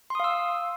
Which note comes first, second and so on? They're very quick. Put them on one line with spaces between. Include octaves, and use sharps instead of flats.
C6 D#6 F5 E6